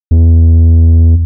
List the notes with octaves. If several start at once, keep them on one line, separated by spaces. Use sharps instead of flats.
E2